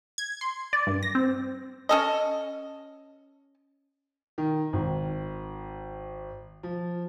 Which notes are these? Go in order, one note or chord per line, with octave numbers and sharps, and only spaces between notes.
G#6
C6
D5
G2
A#6
C4
C#4 A4 D#5
D#3
G#1
F3